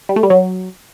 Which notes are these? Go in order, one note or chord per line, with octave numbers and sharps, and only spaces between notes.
G3
A3
G3
F#3